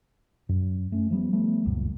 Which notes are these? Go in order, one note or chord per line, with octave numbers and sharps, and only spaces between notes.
F#2
A3 C#4
F3 G3 B3
F3 G3 A3 B3
F1 C#2 F#2 A#2